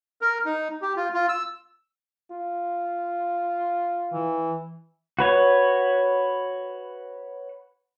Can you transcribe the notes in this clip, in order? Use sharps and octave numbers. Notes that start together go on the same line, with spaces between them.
A#4
D#4
G4
F4
F4
E6
F4
E3
F#4 B4 C#5